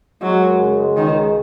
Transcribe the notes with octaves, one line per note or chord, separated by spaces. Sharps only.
F#3 G#3
F#2
C#3
G#3
C#2 D#3
C#3